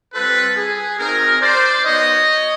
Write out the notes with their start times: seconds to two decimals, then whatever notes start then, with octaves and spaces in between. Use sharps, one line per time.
0.13 G3 C4 F4 A4 B4
0.56 G#4
0.99 C4 D#4 F#4 G#4 A#4
1.41 C5 D5
1.85 B3 D#4 F#4 C#5 D#5